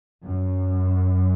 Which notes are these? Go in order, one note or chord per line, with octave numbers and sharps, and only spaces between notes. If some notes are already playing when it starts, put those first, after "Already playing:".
F#2